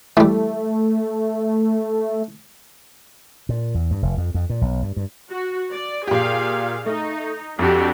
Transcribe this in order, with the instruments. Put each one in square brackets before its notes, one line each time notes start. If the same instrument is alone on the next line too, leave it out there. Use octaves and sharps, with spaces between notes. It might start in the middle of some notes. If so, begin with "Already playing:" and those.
[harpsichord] E3 G3 [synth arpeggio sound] A3
[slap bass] A#2
E2
G2
F1
F2
F2
A#2
B1
G2
G2
[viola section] F#4
D5
[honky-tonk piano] A#2 G4 [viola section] G#4 F5
[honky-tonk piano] A3 [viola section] D#4
[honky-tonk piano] F2 [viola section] D4 F#4 G4